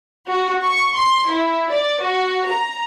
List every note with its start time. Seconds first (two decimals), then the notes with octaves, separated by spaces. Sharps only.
0.26 F#4
0.63 C#6
0.96 C6
1.30 E4
1.70 D5
1.99 F#4
2.50 A#5